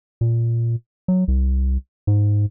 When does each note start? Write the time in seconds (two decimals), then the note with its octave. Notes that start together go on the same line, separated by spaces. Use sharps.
0.21 A#2
1.08 F#3
1.28 C2
2.07 G#2